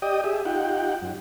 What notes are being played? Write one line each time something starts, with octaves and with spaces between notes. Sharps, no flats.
G4 D5 D#5 G5 D#6
G4 G#4 E5
D#4 F4 G4 F#5 G5
F#2